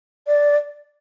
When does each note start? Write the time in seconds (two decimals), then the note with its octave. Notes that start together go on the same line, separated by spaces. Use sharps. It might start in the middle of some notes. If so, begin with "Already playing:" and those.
0.27 D5